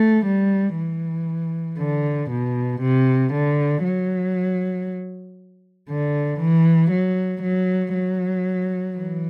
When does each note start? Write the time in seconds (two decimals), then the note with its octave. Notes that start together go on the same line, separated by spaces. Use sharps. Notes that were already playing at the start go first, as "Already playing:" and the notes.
Already playing: A3
0.26 G3
0.77 E3
1.79 D3
2.30 B2
2.81 C3
3.33 D3
3.84 F#3
5.90 D3
6.40 E3
6.91 F#3
7.42 F#3
7.94 F#3
8.96 E3